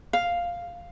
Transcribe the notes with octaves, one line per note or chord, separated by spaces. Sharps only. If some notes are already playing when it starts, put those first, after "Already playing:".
F5